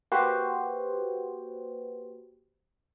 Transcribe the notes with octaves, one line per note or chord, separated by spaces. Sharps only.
A#3 F#4 G4 B4 C5